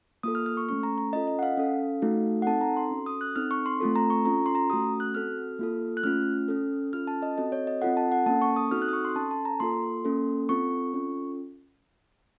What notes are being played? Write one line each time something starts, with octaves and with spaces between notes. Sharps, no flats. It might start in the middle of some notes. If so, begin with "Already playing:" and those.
A#3 F4 A4 D#6
F6
F6
C#6
A3 C#4 A4 C#6
A#5
A#5
C#4 F4 A4 D#5
D#5
F#5
F5
C#4 A4
A3 D#4 F#4 A4
F#5
C4 D#4 A4 A5
A#5
C6
C#4 F#4 A4
D#6
F#6
C4 D#4 A4 F6
C#6
C6
A3 C4 F4 A4
A#5
C#6
C#4 F4 A4 A#5
C6
A#5
A3 C#4 F#4 A4 D#6
F#6
C4 F#4 A4 F6
A#3 F4 A4
F#6
A3 C#4 F4 F6
C#4 A4
C#4 F4 A4 F6
A5
D#5
C4 F#4 A4 D#5
C#5
D#5
C4 F4 A4 F#5
A5
F#5
A#3 C#4 A4 A5
C#6
D#6
C4 D#4 F#4 A4 F6
F#6
D#6
C#6
C6
C#4 A4 A5
A5
A#5
A#3 F4 A4 C6
A#3 C#4 A4
C4 F4 A4 C#6
C#4 F4 A4